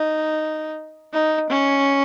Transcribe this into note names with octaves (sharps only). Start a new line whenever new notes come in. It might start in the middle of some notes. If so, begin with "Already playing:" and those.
Already playing: D#4
D#4
C#4